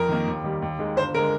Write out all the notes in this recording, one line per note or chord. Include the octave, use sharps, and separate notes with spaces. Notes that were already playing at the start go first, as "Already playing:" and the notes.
Already playing: F2 A#4
D#3 A#3
D#2
D#3 G3
D#2
D#3 G#3
G1 C5
D3 G#3 A#4